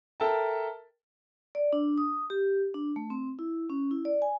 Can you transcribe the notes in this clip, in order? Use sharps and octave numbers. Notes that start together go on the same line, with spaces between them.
A4 A#4 E5 G5 A5
D5
D4
D#6
G4
D4
A3
C4
E4
C#4
E4
D5
G#5